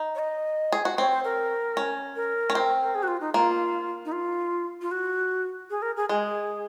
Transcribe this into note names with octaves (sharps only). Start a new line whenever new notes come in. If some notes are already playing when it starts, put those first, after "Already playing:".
Already playing: D#4
C#5
D#5
G#4
F#4
C4 C#5
C5
A#4
C#4
A#4
C#4
C4
A#4
G#4
F#4
F4
D#4
A#3 F4
D#4
F4
F4
F#4
G#4
A#4
G#4
G#3 G#4